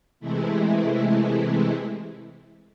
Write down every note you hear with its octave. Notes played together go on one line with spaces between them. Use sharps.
C3 E3 G#3 A3 E4